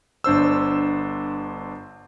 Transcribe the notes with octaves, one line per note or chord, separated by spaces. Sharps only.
G1 D4 C5 E6